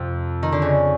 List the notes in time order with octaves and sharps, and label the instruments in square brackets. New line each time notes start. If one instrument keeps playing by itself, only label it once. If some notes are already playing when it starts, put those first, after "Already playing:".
Already playing: [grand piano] F2 [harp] C3
[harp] D#3
D3
C#3